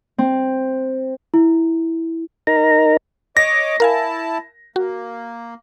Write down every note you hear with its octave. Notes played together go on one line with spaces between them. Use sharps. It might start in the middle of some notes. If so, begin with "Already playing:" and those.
C4
E4
D#4 A#4 A#5
C#5 D#5 D6 A#6
E4 A#4 F5 G#5 A5
A#3 F#4